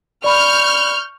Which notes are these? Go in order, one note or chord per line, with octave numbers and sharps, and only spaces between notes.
D5 B5 C#6 F6 G6